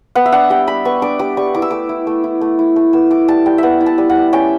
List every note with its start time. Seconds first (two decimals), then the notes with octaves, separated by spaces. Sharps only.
0.15 B3 F#5
0.26 E5
0.32 D4 F#5
0.50 G3 G5
0.67 G3 B5
0.85 B3 C#6
1.02 D4 D6
1.19 G3 D6
1.37 G3 C#6
1.54 E4 D6
1.62 E6
1.71 A3 D6
1.89 E4
2.07 A3
2.24 E4
2.41 A3
2.59 E4
2.76 A3
2.93 B3 E6
3.11 E4 D6
3.28 G3 A5
3.46 G3 G5
3.58 B3 E5 F#5
3.81 E4
3.86 A5
3.98 G3
4.10 F#5
4.16 G3
4.33 C#4 G5